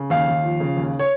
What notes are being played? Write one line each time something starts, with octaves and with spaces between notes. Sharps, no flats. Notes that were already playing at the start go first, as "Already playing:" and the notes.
Already playing: C#3
D#2 F5
D#2
F3
C#3
D#2
C#5